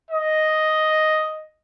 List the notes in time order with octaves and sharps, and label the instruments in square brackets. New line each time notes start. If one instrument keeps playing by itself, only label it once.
[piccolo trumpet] D#5